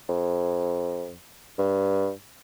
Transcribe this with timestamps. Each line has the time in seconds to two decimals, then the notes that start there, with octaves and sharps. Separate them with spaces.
0.09 F2
1.58 G2